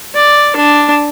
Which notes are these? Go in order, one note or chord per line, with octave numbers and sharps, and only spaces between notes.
D5
D4